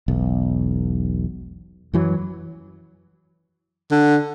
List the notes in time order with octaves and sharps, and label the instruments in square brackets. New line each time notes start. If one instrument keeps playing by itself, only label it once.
[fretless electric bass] E1 B1
F#2 E3 F#3
[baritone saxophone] D3